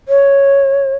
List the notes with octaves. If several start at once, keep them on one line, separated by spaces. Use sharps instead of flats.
C#5